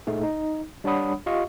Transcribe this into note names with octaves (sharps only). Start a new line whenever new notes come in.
A#2 A3 D#4 G#4
D#4
G3 D4 C#5 F#5 B5 D#6
F4 G4 D#5 F5 C#6